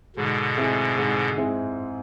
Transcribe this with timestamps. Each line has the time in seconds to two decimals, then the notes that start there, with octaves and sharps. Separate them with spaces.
0.16 G#2 B2 D3
0.57 G#3 C4 E4 G#4
0.97 G#2
1.38 G#3 C4 E4 G#4